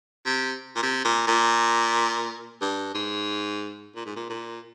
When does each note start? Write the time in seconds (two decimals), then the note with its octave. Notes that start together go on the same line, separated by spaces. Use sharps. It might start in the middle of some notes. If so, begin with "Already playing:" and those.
0.26 C3
0.76 A#2
0.82 C3
1.04 A#2
1.27 A#2
2.61 G2
2.94 G#2
3.95 A#2
4.06 G#2
4.16 A#2
4.29 A#2